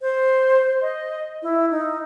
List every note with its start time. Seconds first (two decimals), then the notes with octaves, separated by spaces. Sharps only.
0.01 C5
0.82 D#5
1.42 E4
1.71 D#4